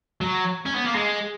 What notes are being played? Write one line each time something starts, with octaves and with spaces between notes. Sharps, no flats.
F#3
C#4
B3
A#3
G#3